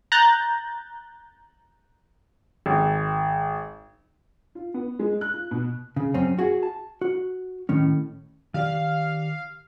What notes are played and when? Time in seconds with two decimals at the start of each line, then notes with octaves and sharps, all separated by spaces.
0.12 A#5 F#6 G6 A6
2.66 G#1
4.55 F4
4.74 B3
4.99 G#3
5.21 F#6
5.34 F4
5.51 B2
5.96 C#3
6.14 F#2 C4 C#4
6.39 F#4 G#4
6.63 A5
7.01 F#4
7.69 A2 D#3 C#4
8.54 D#3 G4 D5 F5